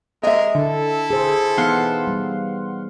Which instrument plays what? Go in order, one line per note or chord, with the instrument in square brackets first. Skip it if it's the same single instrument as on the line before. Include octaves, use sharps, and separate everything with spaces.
[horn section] C3 G#3 A#4 [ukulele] D#5 E5
[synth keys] D3 [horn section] E4 A4
[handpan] G#4 C5
[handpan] E3 B3 D#4 [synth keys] F5 F#5 C6
[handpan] G3